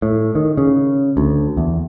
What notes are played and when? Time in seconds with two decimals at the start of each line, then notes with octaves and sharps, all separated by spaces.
0.02 A2
0.35 D#3
0.57 C#3
1.17 D2
1.57 E2